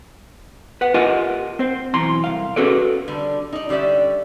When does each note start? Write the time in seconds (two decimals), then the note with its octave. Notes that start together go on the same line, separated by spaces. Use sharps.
0.81 B4 F#5
0.94 F4 G4 A#4 D#5 F#5 G#5
1.59 C4 C5
1.94 B1 E3 A#5 C6
2.24 C2 F5
2.56 C#4 F#4 G#4 A4 B4 D5
3.08 D3 G3
3.53 D#4 D5
3.69 D3 G3 C#4 D5 E5